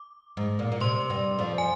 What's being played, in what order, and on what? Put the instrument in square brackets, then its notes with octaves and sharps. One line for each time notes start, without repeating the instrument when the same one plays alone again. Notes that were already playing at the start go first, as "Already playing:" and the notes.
Already playing: [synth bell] D6
[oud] G#2
A#2
A#2
[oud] C3 [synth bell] C6
[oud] G2 G3
F2 F3
[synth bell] G#5